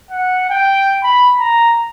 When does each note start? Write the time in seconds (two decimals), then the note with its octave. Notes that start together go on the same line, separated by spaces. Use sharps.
0.10 F#5
0.50 G5
1.04 B5
1.39 A#5